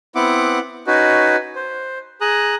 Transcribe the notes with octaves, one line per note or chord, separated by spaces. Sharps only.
B3 C4 E4 F#5 D6
C#4 D#4 F#4 B4
C5
G#4 A#5 D#6 F#6